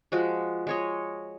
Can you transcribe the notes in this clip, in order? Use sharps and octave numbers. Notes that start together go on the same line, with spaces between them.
F3 G#3 F#4
G#3 C#5 D#5